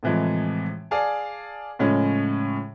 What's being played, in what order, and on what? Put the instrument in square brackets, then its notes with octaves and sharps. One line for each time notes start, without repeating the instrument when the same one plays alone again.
[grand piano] A2 C3 E3 F3 G#3
G#4 D5 F5 A5
A2 C#3 F3 G#3 C#4